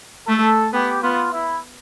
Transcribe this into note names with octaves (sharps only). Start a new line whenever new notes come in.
A3 A4
B3 G4
B3 F4
E4